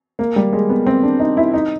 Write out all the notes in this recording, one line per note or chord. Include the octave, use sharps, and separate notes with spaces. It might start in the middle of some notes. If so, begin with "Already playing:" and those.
A#3
G3
G#3
B3
C4
D4
D#4
E4
D#4